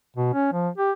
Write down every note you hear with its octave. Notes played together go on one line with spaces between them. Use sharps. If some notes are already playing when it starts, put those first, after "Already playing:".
B2
C#4
F3
G4